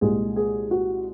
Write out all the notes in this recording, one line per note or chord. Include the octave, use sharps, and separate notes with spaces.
C2 A#2 G#3 G#4
G#4
F#4